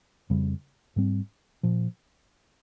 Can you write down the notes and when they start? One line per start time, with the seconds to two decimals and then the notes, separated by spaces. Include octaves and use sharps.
0.30 F2 C#3 G3
0.96 G#2 G3 C4
1.63 A#2 F3